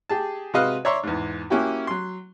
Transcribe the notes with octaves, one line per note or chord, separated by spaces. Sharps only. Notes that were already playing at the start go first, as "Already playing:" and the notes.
G4 G#4 A5
C3 G#3 F#4 B4 D#5 F5
C#5 D5 E5 A#5 C6 C#6
E2 G#2
A#3 C#4 E4 F#4 G4
F#3 C6